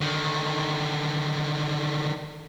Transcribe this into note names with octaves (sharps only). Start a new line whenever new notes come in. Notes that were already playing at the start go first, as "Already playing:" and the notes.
D3 D#3